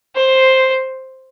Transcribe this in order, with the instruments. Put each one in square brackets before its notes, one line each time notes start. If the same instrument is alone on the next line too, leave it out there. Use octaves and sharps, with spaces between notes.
[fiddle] C5